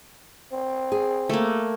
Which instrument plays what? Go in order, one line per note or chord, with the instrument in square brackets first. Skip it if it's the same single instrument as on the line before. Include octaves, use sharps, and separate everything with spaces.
[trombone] C4
[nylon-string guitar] G#4
[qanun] A3 A#3